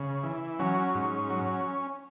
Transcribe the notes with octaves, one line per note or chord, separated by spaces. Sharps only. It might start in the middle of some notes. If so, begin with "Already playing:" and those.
Already playing: C#3
E3
F#3 C#4
G#2
F#3